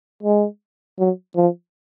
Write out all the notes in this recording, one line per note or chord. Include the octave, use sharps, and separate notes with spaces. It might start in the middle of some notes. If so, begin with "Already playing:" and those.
G#3
F#3
F3